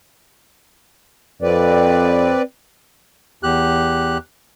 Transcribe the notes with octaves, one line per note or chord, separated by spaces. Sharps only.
F2 C4 B4 D5
E2 G4 F#6